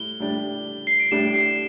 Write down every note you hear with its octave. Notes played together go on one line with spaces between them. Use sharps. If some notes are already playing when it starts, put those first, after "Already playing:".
Already playing: A2 G3 G7
A2 G3 D4 G4
C7
D7
A2 G3 D4 G4 E7
C7